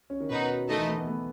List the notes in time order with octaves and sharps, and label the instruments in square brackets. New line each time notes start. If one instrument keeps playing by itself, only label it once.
[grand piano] C#4
D#3
[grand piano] B2 [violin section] D#4 F#4 B4
[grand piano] D#3 [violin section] A3 D#4 A4 D#5
[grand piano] E3
A3
B3
A3